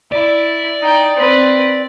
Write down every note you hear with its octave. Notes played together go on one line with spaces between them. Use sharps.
E4 D5
D#4 G5
C4 B4